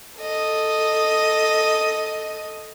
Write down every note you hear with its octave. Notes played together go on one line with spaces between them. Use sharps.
A4 D#5